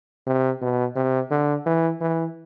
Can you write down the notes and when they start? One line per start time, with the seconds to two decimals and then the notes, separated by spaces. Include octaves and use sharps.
0.27 C3
0.61 B2
0.96 C3
1.31 D3
1.66 E3
2.01 E3